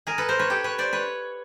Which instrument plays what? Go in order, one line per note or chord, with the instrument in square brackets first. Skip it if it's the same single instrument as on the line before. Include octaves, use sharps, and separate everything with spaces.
[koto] G#4 A#4
A4 B4
A#4 C5
B4 C#5
G4 A4
B4 C#5
C5 D5
B4 C#5